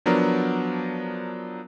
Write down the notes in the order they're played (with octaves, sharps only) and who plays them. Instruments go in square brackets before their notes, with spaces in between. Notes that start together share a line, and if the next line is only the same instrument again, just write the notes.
[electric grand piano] F3 F#3 B3 D4 A#4